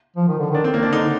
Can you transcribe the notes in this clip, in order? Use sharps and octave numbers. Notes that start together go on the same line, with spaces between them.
F3
D#3
D3
D#3 D4
C4
A#3
D4
D3 D#4